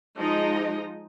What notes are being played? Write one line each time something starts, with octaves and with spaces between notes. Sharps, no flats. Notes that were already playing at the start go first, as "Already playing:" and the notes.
F3 G#3 D#4 D#5